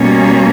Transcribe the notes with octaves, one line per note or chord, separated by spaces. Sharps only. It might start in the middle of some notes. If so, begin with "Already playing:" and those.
Already playing: B2 G3 A#3 C#4